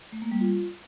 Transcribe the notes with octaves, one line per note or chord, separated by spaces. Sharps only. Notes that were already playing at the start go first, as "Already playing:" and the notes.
A3
A#3
G3
F4